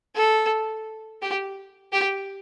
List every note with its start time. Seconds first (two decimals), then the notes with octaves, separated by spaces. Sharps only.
0.16 A4
1.22 G4
1.93 G4